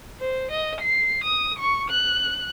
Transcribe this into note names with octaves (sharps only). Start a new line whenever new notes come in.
C5
D#5
C7
D#6
C#6
F#6